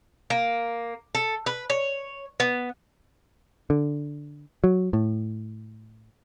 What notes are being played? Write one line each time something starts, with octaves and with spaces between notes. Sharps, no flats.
A#3
A4
B4
C#5
B3
D3
F#3
A2